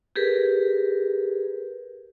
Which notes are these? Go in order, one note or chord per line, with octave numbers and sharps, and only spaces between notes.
G4 G#4 A#4 B4